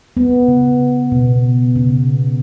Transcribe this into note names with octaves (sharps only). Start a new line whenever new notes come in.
B3
C#3
B2
C#3